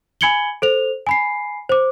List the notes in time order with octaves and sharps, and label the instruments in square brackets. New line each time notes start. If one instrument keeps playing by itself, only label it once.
[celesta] G#5 B5 G#6 C#7 F#7 G7
A4 C5 F7
G#5 B5 C7
C5 D6